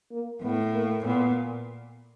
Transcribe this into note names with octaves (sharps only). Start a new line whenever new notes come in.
A#3
A2 B3
A#3
A#2 B3